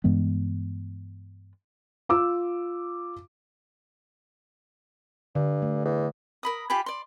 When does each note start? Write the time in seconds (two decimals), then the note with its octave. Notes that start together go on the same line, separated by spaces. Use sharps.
0.04 G2 E3 G#3 B3
2.09 F4 D6 E6
5.35 G2 D3
5.62 A3
5.85 E2
6.43 A#4 B5 D#6
6.70 F4 G4 G#5 B5
6.86 D5 C6